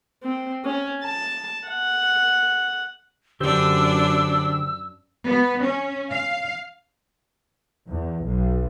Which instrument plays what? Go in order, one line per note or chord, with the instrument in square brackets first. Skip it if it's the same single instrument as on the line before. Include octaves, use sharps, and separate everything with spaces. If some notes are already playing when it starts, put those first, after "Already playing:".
[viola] C4
C#4
A5
F#5
[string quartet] F#2 D4 [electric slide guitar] D3 G4 C5 [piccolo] E6
[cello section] B3
C#4
F5
[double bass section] E2
B1